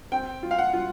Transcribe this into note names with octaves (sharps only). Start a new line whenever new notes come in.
C4 G5
F4
F5
F#5
F4